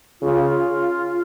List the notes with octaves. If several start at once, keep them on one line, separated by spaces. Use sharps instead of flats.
C#3 F4